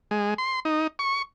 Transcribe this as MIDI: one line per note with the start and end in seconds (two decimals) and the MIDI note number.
0.11 0.34 56
0.38 0.60 84
0.65 0.87 63
0.99 1.22 85